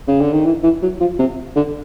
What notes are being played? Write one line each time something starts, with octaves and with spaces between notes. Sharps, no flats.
C#3
D3
D#3
E3
E3
F#3
F3
C3
D3